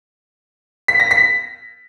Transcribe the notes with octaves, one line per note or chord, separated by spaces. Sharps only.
B6
A#6
B6